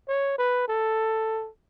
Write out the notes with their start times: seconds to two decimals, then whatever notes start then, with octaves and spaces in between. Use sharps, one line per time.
0.08 C#5
0.38 B4
0.68 A4